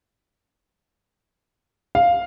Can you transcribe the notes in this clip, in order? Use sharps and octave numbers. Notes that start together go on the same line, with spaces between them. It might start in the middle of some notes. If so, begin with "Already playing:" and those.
F5